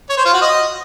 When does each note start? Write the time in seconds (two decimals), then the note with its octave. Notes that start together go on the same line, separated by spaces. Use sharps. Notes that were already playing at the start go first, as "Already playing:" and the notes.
0.10 C#5
0.18 C5
0.26 F4
0.34 F#4
0.42 D#5